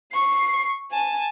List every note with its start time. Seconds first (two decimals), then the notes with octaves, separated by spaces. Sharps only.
0.12 C#6 C7
0.91 G#5 A5